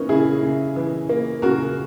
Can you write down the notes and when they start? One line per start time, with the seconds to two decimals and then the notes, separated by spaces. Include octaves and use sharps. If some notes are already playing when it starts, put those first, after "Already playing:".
Already playing: E3 A#3 B3 C#4 D#4
0.09 C#3 E4 G#4
0.43 C#3
0.76 E3
1.09 A#3
1.42 C#3 F#4 A#4